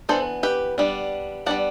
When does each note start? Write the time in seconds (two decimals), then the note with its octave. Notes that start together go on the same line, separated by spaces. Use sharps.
0.09 E3 B3 D4 A4 C5
0.43 G4 B4
0.78 G3 B3 D4
1.46 G3 B3 D4 D5 F#5